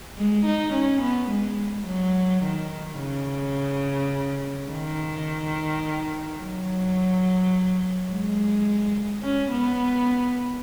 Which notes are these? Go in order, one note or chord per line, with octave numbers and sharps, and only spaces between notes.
G#3
D#4
C#4
B3
G#3
F#3
D#3
C#3
D#3
F#3
G#3
C#4
B3